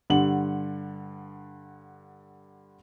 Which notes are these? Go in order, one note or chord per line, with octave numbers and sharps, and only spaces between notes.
G2 D3 F#5 F#7